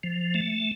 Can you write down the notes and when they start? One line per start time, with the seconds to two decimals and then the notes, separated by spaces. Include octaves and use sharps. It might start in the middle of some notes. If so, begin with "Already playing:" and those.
0.03 F3
0.34 A3